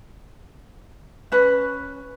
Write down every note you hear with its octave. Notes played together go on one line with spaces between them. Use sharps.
C#4 B4